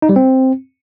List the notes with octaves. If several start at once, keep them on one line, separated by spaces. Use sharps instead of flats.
D#4
G3
C4